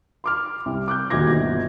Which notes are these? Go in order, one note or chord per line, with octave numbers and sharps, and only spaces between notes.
C6 D6 F6
C2
D6 F#6 G6
D#1 D2 D#3 D6 G#6 A#6
G1 B2